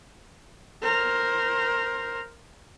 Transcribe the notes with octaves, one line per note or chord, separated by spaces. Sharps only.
A#4 C5